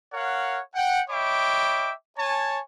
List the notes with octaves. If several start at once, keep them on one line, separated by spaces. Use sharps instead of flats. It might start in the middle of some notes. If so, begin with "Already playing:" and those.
A#4 C#5 F5 F#5
F#5 G5
C#5 D#5 E5 G5 B5 D6
C#5 G#5 A5